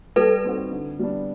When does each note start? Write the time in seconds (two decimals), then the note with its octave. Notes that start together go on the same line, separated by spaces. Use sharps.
0.16 G3 A4 B4
0.44 C4 D#4 F#4
0.71 D3
0.99 G3 B3 D4